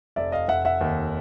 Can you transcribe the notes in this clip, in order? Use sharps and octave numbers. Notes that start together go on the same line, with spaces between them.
F1 D5 E5
D#5 F5
F1 E5 F#5
E5 F#5
D#2